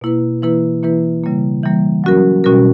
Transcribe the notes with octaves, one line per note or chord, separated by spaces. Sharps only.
B2 A#3 E4 B4
E3 A#3 E4 B4
E3 A#3 E4 B4
C#3 G3 A#3
E3 G3 A#3
F#3 C#4 F#4 A#4
B2 G3 C#4 F#4 A#4